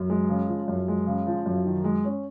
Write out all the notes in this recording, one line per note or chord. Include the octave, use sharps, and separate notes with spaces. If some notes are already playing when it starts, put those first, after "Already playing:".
Already playing: F#2
G#3
C#3
F3
F#2
G#3
C#3
F3
F#2
D#3
G#3
C#4